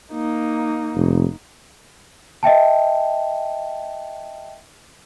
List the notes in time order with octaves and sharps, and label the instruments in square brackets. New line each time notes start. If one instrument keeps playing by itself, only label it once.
[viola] A#3 D#4
[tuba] F1
[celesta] D#5 E5 G5 A5